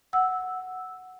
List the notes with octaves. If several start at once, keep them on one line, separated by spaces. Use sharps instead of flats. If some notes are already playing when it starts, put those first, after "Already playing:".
F#5 E6